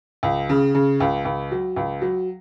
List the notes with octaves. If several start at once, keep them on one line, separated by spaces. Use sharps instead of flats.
C#2
C#3
C#3
C#2
C#2
F#3
C#2
F#3